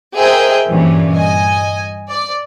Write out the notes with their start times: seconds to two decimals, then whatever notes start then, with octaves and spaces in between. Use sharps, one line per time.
0.16 G#4 A#4 C5 D#5 E5 G5
0.70 G2 A#2 E3 C#4
1.13 D#5 G#5
2.10 D5